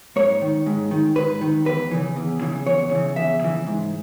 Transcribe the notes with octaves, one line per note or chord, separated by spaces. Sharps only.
G#2 C#5
D#3
G#2
D#3
G#2 B4
D#3
E2 B4
C#3 E3
E2
C#3 E3
E2 C#5
C#3 E3
E2 E5
C#3 E3
G#2